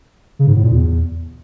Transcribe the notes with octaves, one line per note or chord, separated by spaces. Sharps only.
C#3
G#2
A2
A#2
E2